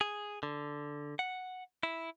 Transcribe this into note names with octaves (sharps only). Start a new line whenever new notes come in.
G#4
D3
F#5
E4